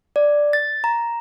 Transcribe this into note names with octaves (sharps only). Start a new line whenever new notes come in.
D5
A6
A#5